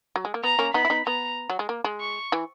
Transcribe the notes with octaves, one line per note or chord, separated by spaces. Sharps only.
F#3
G#3
A#3
B3 A#5
A#3 C#4
B3 D#4 B5
E4
B3 D#4
B3 A#5
F#3
G#3
A#3
G#3
C#6
E3